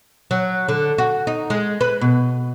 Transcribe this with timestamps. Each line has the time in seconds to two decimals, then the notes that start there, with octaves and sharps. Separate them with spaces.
0.31 F#3
0.69 D3
0.98 F#4
1.27 D#4
1.50 G#3
1.81 B4
2.01 B2